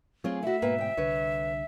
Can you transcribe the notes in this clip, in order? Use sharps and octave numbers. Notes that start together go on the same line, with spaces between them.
F#3 A3 C4 F4 G#4 C#5
A3 E4 F#4 E5
G#2 B2 A#3 B4 G5
D2 G5
C2 D3 B4 C#5